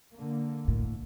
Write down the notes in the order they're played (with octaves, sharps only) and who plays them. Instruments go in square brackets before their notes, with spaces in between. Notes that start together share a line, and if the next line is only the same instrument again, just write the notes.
[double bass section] D3 A#3
[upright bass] A2